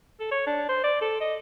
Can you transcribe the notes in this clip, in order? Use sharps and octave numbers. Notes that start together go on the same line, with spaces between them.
A4
C#5
D4
C5
D5
A4
D#5